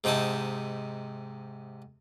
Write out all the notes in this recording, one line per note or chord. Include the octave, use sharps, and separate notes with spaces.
G#2 C3 D#4 E4 A5